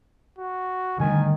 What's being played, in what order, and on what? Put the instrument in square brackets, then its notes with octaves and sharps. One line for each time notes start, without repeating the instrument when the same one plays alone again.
[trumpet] F#4
[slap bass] D3 G3 A3 [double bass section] D#3 [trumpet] G#5